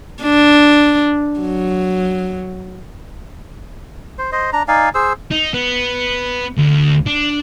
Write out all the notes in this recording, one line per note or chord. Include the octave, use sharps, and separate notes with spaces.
D4
F#3
C5
C5 D#5
D4 A#5
D#4 D5 F5 G#5
G#4 C5 E6
D#4
B3
D2
D4